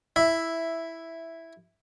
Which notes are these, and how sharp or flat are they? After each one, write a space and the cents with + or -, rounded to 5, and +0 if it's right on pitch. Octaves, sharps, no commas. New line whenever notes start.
E4 +0 E5 +5